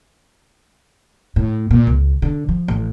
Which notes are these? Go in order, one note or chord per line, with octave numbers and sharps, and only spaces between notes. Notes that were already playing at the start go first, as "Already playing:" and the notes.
A2
A#2
C#2
D3
F3
A1